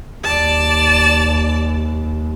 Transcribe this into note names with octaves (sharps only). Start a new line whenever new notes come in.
D#2 D5 A5